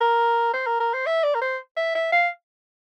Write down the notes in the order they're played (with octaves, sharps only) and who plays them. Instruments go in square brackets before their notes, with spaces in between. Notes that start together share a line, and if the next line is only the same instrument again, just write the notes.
[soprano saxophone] A#4
C5
A#4
A#4
C5
E5
D5
A#4
C5
E5
E5
F5